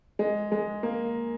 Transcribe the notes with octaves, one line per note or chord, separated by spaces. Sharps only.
G#3
G#3
A#3